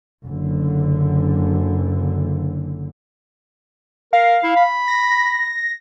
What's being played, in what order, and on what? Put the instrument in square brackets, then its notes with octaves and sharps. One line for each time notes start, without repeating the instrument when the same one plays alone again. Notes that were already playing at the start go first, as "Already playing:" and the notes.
[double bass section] F#1 D3
[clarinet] A#4 [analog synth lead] F5
[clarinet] E4
B5
[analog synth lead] A#6